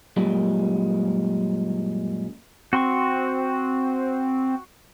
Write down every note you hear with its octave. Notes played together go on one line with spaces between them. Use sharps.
F#2 A#2 G3 G#3
C4 F#4 C6 C#6